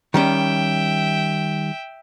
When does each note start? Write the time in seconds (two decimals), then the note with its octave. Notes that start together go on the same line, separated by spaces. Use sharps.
0.14 D#3 G3 C#4 E5 G5